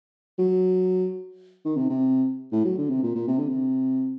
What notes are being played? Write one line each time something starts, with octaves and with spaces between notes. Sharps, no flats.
F#3
D#3
C3
C3
A2
F#3
D3
C3
A#2
A#2
C3
D3
C3